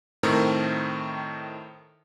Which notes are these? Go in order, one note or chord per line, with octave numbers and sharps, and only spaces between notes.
A2 D#3 A3 C4 A#4